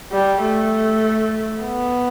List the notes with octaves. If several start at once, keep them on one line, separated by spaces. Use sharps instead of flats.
G3
A3
B3